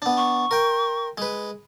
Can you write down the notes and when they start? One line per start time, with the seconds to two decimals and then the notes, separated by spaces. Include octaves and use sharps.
0.02 B3 D4
0.17 C#6
0.51 A#4 G5
1.18 G#3 B4